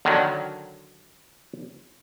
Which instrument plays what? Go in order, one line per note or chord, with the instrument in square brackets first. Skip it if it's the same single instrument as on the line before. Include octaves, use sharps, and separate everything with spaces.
[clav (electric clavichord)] D3 D#3 F#3